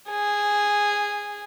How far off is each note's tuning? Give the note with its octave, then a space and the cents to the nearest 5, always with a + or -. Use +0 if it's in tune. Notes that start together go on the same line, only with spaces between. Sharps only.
G#4 -10